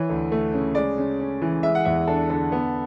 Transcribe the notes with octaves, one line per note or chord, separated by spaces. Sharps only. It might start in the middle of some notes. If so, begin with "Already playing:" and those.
Already playing: E3 C#5
D2
A3
C#3
G#3 D5
C#3
C#4
E3
G#3 E5
F#5
E2 E5
D4 A4
D3 A4
B3